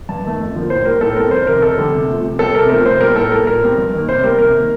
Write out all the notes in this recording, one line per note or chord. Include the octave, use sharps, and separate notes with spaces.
G2 A5
D#3 A3
F2
D3 F3 A#3
A2 C5
G3 A#3 A#4
A2 A4
G3 C4 A#4
F2 C5
C3 D#3 A#4
F2 A4
D3 G3
C3
F3 A3
C3
G3 C4 A4
C3 A#4
F3 A3 C4 A#4
C3 C5
G3 A#3 A#4
A2 A4
G3 A#3 A#4
A#2 A#4
G3 C4
G2
D#3 A#3
C3 C5
G3 A#3 A#4
C3 A#4
D#3 A#3